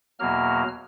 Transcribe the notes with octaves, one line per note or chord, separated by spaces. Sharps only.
E2 B2 F#3 A#3 F6